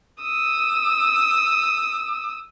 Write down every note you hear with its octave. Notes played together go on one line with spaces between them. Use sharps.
D#6 E6